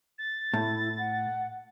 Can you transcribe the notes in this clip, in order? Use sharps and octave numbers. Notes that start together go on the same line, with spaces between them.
A6
A2 E4
F#5